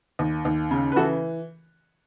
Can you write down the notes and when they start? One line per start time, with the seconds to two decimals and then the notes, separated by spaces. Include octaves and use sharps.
0.19 D#2
0.45 D#2
0.71 C#3
0.92 B4
0.96 E3 F#4 A4